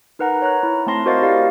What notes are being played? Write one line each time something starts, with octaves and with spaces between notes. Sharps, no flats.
D#4 A#4 B4 F#5 A#5
C#5 A#5 F#6
E4
A3 C4 A5 C6 A#6 C7
F#4 A#4 C5 D#5 F5 A6
E4 G4 D5 F5